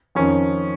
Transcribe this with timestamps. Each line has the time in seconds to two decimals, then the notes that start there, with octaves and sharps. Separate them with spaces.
0.15 F2 D#3 C#4